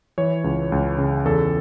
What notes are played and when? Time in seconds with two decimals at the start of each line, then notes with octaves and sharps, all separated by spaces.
0.18 E3 C#5
0.44 C#2
0.72 C#2
0.98 C#3
1.25 E2 A4